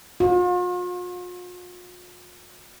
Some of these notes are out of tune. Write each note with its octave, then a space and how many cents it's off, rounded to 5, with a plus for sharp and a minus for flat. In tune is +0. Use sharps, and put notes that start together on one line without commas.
F4 +45